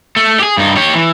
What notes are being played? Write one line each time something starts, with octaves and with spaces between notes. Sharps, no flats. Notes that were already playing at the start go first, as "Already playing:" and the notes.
A3
G4 G#4
G2 D#4
G4 C#5
E3